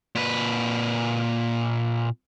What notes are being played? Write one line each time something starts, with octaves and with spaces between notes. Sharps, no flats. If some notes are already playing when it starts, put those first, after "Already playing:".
A#2 B4